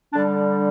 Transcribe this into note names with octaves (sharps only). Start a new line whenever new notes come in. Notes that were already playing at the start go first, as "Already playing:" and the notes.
D3 G3 D4